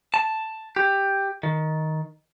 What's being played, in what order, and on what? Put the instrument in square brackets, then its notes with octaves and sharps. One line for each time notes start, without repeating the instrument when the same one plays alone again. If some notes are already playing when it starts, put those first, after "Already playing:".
[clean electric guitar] A5
G4
D#3